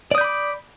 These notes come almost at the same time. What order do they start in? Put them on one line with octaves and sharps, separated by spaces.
D5 D#6 G6 B5 D6